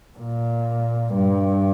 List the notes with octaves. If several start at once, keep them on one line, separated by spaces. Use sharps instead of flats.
A#2
G2